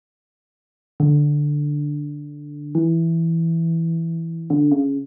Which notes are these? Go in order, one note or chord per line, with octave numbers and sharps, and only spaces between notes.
D3
E3
D3
C#3